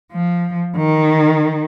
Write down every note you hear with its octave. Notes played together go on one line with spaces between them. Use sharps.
F3
D#3